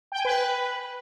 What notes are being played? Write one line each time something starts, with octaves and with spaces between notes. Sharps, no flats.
G5
G#5
B4